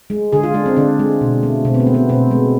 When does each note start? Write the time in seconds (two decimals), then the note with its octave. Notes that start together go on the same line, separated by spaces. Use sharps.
0.10 G#3
0.32 D3 G#4
0.43 F4
0.54 G#3 D4
0.66 C4
0.77 D3 D4
0.99 G#3
1.21 B2
1.43 A3
1.65 B2 C4
1.74 B3
1.80 C4
1.87 A3
1.94 B3
2.09 B2 C4
2.31 G#3